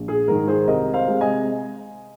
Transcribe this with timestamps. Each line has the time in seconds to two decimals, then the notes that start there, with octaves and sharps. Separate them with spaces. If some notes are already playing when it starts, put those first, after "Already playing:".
Already playing: A#1
0.08 G#4
0.27 G#2 D#3 A#4
0.48 G#4 C5
0.67 C2 A#4 D#5
0.94 C5 F5
1.07 C3 G#3
1.21 D#5 G#5